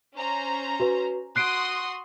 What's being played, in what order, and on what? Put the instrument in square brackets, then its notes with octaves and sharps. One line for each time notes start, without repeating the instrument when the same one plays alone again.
[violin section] C#4 C5 A#5
[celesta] F#4 B4
[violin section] F#4 C6 D#6 [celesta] F#6 C7 D7